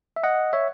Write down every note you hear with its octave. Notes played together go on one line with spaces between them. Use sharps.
E5
D#5 F#5
C#5 E5